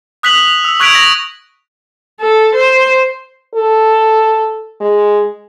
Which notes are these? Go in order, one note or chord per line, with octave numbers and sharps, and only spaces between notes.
D#6 F#6 B6 F7 F#7
E6
C#6 F#6 G#6 B6 D7 F7
A#6
A4
C5
A4
G#3